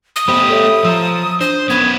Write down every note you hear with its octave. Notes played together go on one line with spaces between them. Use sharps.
D#6
A3 B3 G4 C5 B5
A4 C#5 E5
F3 A#5 E6
D4 C5 D#6
B3 C#4 B4 G#6